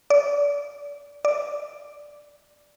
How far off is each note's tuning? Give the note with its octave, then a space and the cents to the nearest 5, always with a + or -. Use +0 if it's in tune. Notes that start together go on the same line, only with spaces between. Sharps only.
D5 -30
D5 +0